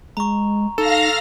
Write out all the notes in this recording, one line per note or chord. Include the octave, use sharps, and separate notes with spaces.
G#3 A#5 C#6
D#4 A4 F5 F6 A#6 E7